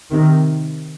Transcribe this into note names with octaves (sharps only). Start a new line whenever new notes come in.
C3 D#3